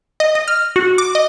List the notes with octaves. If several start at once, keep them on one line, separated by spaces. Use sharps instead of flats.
D#5
D#5
F6
F#4
D6
D#5